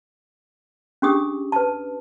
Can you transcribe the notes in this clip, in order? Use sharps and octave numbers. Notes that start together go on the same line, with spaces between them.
C#4 D4 G4 G#4 D#6
B4 A5